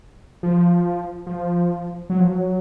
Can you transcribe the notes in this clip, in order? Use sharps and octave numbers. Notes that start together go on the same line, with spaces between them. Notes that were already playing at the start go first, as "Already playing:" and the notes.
F3
F3
F#3
F3
F#3